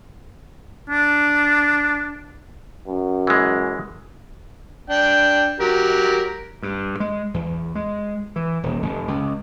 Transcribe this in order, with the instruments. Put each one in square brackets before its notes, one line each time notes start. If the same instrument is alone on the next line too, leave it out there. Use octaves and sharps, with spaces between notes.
[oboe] D4
[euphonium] F#2
[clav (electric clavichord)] E3 G#3
[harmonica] D4 G5
F#3 G4 A#4
[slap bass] G2
G#3
E2
G#3
E3
D#1
F1
C#2